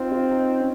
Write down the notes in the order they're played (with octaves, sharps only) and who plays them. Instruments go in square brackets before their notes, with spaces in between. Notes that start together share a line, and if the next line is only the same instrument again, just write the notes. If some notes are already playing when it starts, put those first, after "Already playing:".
Already playing: [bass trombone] C4 [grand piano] D#4 F4
[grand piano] F4
D#4
C#4